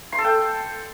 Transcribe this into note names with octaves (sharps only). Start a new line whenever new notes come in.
C6
A4
G5